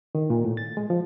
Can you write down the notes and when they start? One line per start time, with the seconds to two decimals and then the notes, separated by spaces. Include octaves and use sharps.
0.15 D#3
0.30 A#2
0.44 A2
0.57 A6
0.77 G#3
0.90 F3